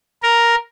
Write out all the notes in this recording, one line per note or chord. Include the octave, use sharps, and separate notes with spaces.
A#4